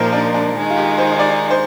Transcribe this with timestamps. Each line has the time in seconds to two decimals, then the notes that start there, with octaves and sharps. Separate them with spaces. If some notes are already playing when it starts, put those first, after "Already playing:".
Already playing: A#2 F3 A#3 D#4 A#4 C5
0.12 D4
0.34 D4
0.55 D#3 G#3 D#4
0.70 F4
0.77 G4
0.98 C5
1.19 D5
1.50 C5